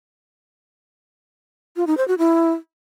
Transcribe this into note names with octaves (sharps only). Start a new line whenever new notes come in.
F4
D#4
C5
F#4
E4